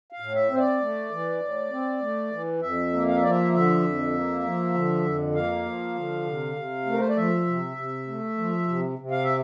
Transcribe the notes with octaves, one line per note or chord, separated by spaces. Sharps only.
F5
A2
E5
C4 C5
D5
A3
E3
A2
C4
A3
E3
F2 E5
A#3
F5
E5
F3 D5
E5
D3 E5
F2
A#3
F3
D3
F2
A#3 F5
F3
D3
C3
C3
A3
A#4
C5
D5
F3 E5
C3
C3
A3
F3
C3
C3
F5
E5